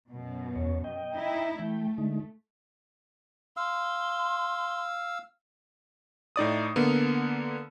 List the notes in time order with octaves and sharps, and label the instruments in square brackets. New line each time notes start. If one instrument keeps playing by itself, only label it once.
[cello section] F#2 B2
[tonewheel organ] E2 C#5
D#5 G5
[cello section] D#4 E4
[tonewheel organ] E3 G5 [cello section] A3
[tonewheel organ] D3 G#3 D#4
[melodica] F5 E6 [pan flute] C6
[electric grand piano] A2 D#4 D5 D#6
D3 A#3 B3